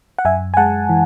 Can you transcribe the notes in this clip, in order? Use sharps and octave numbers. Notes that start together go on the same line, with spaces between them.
F#5
F#2 E5 G#5
G#5
G#3 F#5 A5
E3